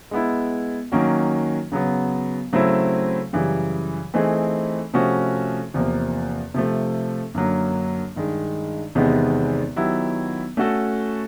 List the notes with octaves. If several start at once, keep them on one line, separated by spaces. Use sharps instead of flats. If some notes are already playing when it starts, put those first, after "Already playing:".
G#3 B3 E4
D#3 F#3 A#3 C#4 F#4
C#3 F#3 B3
C#3 F#3 A3 C4 E4
F#2 C#3 E3 G3
E3 A3 C4 D#4 G#4
C3 F3 A3 C#4 F#4
E2 C3 F3 A#3
C3 F3 A3
F#2 D3 F#3 A#3
G2 D#3 G#3
E2 C3 D#3 G#3 B3
D#3 F#3 B3 E4 G4
A3 C#4 F#4 A4